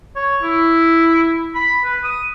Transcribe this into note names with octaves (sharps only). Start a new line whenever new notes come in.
C#5
E4
B5
B4
D#6